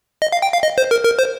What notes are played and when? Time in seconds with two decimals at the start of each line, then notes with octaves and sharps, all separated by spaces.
0.22 D#5
0.32 F5
0.42 G5
0.53 F5
0.63 D#5
0.78 C5
0.91 A#4
1.05 A#4
1.19 C5